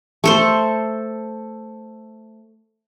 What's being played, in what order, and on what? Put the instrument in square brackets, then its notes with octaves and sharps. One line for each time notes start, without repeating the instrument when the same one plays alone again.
[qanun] A3 A4 C5